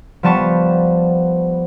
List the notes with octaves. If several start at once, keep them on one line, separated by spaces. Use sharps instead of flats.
F3 G3 B3 A5 C#6